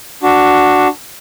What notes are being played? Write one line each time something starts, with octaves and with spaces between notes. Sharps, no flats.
D4 F#4